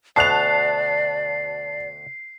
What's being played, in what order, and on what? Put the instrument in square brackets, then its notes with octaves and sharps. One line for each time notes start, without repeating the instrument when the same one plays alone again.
[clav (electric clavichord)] D2 B2 [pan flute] D5 [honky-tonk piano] A5 F#6 F7 [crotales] C7